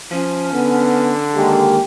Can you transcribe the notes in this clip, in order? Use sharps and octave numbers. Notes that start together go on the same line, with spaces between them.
F3 C#4
D3 B3
D#3 G#3 A#3 G4